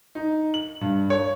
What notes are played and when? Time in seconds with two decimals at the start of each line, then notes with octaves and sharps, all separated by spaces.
0.15 D#4
0.54 F#7
0.81 G2
1.10 C#5